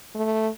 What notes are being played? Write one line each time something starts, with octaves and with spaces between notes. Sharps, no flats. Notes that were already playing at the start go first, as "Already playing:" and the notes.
A3